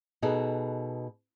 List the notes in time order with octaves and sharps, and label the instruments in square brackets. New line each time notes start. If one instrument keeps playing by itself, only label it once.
[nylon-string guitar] B2 D#4 G#4 A4 B4